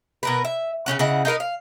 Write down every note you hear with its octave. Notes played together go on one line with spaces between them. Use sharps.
B2 A#4 B4
E5
C#3 E3 C#4 F#4
C#3 E4 D#5 F#5
D#4 F4 A#4 B4
F5